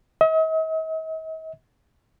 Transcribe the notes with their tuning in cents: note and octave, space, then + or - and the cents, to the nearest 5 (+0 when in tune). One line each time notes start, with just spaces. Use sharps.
D#5 +45